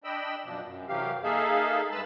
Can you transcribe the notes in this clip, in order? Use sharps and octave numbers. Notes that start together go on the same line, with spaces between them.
D4 D#5 G5 B5 E6
F#2 B2 F3 D4
F#2
F#2 C3 E3 F#3 G4 F5
A#3 D#4 G#4 A4 E5 F5
G2 G#3 B4 A5 B5 E6